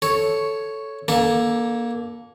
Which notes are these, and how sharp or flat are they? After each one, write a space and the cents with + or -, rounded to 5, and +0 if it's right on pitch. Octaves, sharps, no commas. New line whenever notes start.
A4 -5 C#5 +0
A#3 +20 D4 -25 A4 +0